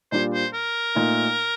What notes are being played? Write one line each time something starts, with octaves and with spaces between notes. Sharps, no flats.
A#2 G3 D4 F4 C5
C5
A#4
A#2 A3 D#4